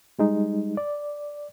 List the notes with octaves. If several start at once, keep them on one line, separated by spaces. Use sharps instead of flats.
G3 G#3 D#4
D5